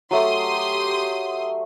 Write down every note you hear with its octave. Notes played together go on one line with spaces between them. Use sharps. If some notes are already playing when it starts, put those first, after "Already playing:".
F#3 A3 G4 C6 D#6